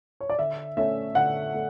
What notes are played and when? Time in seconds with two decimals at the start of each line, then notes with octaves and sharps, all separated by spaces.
0.21 C#5
0.30 D5
0.39 D3 E5
0.77 A3 C#4 E5
1.15 D3 F#5
1.54 A3